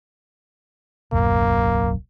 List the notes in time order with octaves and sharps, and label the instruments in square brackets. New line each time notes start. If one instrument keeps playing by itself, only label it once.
[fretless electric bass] D1 B1 F#2 [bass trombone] A#3